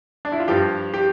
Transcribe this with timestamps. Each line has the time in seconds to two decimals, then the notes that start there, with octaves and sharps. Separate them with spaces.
0.25 D4
0.32 E4
0.40 F4
0.48 G2 F3 G4
0.94 G4